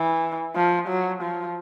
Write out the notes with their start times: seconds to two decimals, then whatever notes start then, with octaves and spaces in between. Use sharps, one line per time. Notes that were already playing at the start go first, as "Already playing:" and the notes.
Already playing: E3
0.55 F3
0.88 F#3
1.22 F3